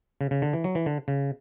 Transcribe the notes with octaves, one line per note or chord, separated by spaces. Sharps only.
C#3
C#3
D3
E3
F#3
E3
D3
C#3